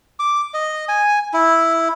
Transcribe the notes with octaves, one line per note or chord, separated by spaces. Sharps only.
D6
D#5
G#5
E4